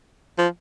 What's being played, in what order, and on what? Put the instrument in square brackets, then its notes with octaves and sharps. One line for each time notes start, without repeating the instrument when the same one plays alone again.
[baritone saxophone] F3